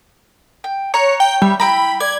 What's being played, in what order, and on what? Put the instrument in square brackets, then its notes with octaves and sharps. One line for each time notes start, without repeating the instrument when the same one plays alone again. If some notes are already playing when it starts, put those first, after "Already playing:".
[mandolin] G5
[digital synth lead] C#5 [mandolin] A#5 F#6
[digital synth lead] G5
[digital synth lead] G3 [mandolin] E5
[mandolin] E4 G5 A#5 [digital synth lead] B5
[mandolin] D5 [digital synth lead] G#6